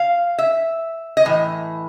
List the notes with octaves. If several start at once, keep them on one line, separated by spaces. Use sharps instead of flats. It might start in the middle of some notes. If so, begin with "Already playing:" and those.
Already playing: F5
E5
D#5
A2 E3